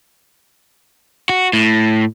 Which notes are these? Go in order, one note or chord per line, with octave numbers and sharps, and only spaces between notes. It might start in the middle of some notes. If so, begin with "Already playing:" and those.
F#4
A2